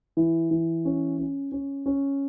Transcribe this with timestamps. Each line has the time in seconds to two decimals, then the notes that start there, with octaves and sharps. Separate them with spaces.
0.17 E3
0.51 E3
0.85 C#4
1.18 C#4
1.52 C#4
1.86 C#4